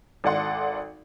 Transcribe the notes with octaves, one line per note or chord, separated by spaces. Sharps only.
G#1 A4 D5 F#5 C6